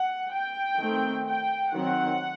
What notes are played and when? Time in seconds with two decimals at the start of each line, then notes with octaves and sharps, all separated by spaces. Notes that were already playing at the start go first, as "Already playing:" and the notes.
Already playing: F#5
0.32 G5
0.78 D#3 A3 C4
1.27 G5
1.73 D#3 F#3 C4 F#5